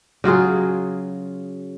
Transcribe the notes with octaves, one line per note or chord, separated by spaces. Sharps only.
C#3 F#3 F4 G#4